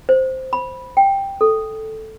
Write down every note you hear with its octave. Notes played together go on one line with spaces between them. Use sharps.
C5
B5
G5
A4